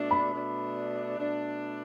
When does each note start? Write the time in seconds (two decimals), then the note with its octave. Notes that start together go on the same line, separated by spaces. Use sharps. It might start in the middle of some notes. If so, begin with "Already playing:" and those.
Already playing: B2 A3 D4
0.11 B5
0.33 B2 A3 D4
1.18 B2 A3 D4